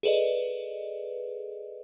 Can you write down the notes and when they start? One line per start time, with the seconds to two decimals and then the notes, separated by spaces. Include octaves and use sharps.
0.03 G#4 A4 B4 D5 D#5